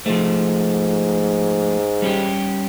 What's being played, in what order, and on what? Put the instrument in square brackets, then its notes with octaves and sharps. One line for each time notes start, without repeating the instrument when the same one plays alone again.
[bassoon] G#2 [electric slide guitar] F3 A3
[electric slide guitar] G3 C#4 G4